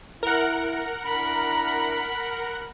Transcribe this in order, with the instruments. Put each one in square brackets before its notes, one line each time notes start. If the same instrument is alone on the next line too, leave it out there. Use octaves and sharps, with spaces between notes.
[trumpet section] E4 [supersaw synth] A#4 F#5
[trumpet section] D4 E4 A#5 [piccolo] B5